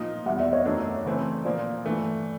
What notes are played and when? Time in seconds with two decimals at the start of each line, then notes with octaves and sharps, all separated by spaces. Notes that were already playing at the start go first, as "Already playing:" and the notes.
Already playing: A#2 F3 A#3 D#4 D#5
0.26 E2 B2 G3 E5 F#5
0.39 D5 E5
0.52 C#5 D#5
0.65 F#2 D#3 F#3 A3 D4
1.05 C#3 E3 A3 C4
1.45 A#2 F3 A#3 C5 D5
1.85 G2 E3 A3